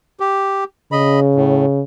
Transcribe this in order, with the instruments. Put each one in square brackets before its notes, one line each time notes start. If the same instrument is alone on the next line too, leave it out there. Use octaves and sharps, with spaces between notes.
[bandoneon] G4
[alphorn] C#3 [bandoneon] D#5 B5
[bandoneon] A2